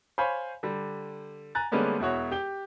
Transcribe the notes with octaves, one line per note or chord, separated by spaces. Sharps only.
C5 C#5 F5 G#5 B5 C#6
D3 G3
G#5 A#5 F#6 A6
D3 G3 G#3 A#3 B3 C#4
E1 B2 E4 F#4 C#5
G4 G7